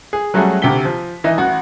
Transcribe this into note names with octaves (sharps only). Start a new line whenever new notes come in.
G#4
F#3 G3 A3 C#4 F#4 G#4
D2 C3 G4 B6 G7
F3
E3 D#4 D#5 E5
A1 F#4